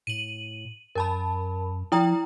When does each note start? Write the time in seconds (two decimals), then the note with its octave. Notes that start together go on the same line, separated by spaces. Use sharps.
0.07 A2 D#7 F#7
0.95 F#2 A#4 A5 B5
1.92 F3 E4 G5 A#5